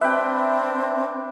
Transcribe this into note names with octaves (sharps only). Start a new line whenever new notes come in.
C4 D4 B4 E5 G5